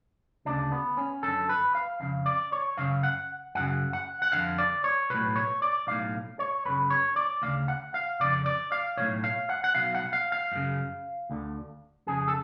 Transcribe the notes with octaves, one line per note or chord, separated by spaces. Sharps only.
D2 C#3 D4
B3
C#4
F#2 D3 A4
B4
F5
F2 C#3 F5
D5
C#5
F#2 C#3 F5
F#5
F#2 C#3 F#5
F#5
F#5
F2 D3 F5
D5
C#5
B1 A2 B4
C#5
D5
B1 A2 F5
C#5
F#2 C#3 B4
C#5
D5
D2 C#3 F5
F#5
F5
F2 C#3 D5
D5
F5
B1 A2 C#5
F5
F#5
F#5
B1 B2 F5
F#5
F5
F5
F#2 C#3
D2 D3
F2 C#3 G#4
A4